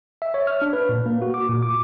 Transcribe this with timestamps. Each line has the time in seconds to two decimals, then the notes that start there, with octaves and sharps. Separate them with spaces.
0.22 E5
0.34 C#5
0.47 F6
0.62 D4
0.73 B4
0.89 A#2
1.06 A#3
1.22 F#4
1.34 D6
1.50 A#2
1.63 D6